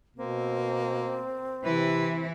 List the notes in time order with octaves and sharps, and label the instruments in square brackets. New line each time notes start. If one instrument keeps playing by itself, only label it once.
[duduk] B2 [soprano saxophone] A#3 [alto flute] C4
[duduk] C3 [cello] E3 E4 [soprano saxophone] B4